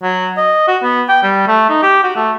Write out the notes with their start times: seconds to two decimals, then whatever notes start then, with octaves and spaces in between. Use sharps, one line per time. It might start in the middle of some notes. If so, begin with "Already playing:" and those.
0.03 F#3
0.37 D#5
0.68 F#4
0.83 B3
1.09 G5
1.23 G3
1.47 A3
1.69 D#4
1.83 G4
2.03 F#4
2.16 A3